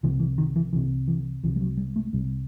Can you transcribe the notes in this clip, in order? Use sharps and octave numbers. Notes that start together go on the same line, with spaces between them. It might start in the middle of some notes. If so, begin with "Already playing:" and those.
C2 C3 E3
E3
D#3
E3
C2 C3 E3
E3
C2 C3 E3
G3
F#3
G3
A3
C2 C3 G3